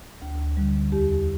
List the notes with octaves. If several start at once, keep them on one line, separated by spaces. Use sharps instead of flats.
D2
D3 G3
E2 G4